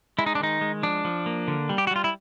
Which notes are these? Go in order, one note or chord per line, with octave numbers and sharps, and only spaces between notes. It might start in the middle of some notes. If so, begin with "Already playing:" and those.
G#3 E4
D#4
D4
D#3 D#4
G#3
F3 D4
F3
A#3
D3
G3
G4
F#4
G3 F4
E4